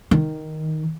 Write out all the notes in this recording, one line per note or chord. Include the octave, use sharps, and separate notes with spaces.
D#3